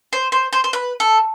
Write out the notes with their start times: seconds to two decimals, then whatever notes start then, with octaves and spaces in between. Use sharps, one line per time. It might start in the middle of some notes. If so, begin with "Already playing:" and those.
0.13 C5
0.32 C5
0.53 C5
0.64 C5
0.73 B4
1.00 A4